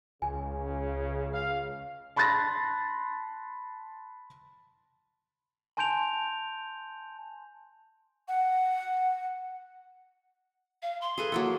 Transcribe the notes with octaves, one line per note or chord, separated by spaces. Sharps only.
C#2 C#3 G#5
F5
A5 B5 C6 F#6 A6 A#6
G#5 A5 C6 G6 D7 F7
F#5
F5
C6
G#4 A4 B4
F#3 A#3 A4